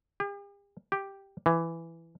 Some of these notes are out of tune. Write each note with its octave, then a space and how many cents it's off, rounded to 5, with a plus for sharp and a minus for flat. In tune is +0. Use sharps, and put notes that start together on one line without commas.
G4 +45
G4 +0
E3 +10